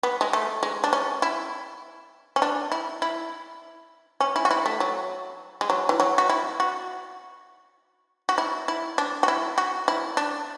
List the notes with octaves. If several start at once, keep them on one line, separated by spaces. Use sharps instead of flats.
B3
G#3
A3
G#3
D4
C#4
E4
C#4
D4
E4
E4
C#4
E4
F#4
E4
A3
F#3
G#3
F#3
E3
F#3
F#4
E4
F#4
F#4
E4
E4
D4
F#4
E4
F#4
E4
D4